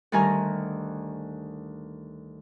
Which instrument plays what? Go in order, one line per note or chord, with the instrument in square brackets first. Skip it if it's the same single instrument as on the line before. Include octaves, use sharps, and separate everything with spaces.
[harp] D2 D#3 G3 A#4 G#5 A#5